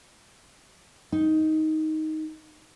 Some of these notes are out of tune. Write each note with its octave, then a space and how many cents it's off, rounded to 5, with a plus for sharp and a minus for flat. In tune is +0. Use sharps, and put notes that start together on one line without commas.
D#4 +10